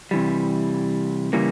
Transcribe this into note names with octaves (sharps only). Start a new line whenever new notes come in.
C3 E3 G3
C#3 E3 G3 A#3